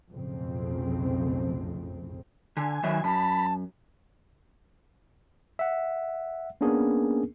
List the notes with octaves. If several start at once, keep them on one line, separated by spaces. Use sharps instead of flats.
B1 F2 A2 C#3 C4
D3 G#5
D#3 F#3 E5
F#2 A5 B5
E5 F#5
A#3 B3 C#4 D4 G#4 A#4